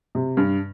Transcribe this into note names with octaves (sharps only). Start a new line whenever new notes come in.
C3
G2